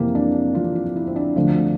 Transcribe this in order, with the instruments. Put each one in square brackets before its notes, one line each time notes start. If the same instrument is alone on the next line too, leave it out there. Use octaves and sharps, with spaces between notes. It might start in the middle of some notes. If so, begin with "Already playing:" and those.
Already playing: [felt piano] F2 C3 E3 A#3
D4
F2 C3 E3 F4
F4
E4
C4
D4
D2 D3 F3 A3